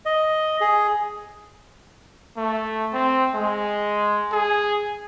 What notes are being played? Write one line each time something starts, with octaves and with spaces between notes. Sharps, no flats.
D#5
G#4
A3
C4
G#3
G#4